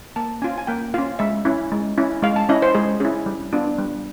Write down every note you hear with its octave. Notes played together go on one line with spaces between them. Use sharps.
A#3 A5
C#4 F4 G#5
G#5
A#3 G5
C#4 F4 F5
G#3 E5
C#4 E4
G#3
C#4 E4
G#3 F5
A5
C#4 E4 D#5
C5
G#3 G#4
C#4 E4 G#4
G3
B3 D4 F4
G3